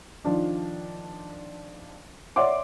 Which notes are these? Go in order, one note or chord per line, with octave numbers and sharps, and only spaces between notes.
D#3 F3 D4
C#5 D5 E5 F#5 C6 D6